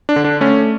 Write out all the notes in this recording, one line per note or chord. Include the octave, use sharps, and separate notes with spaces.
D4
D3
D4
A3 C#4